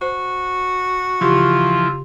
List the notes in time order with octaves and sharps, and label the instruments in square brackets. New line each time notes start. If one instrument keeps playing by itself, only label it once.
[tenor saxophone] F#4 [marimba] C5
[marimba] C#3 G4 [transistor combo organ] E3 F3 [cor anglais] F4